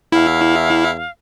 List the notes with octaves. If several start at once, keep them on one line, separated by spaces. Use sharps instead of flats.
E2 E4 F5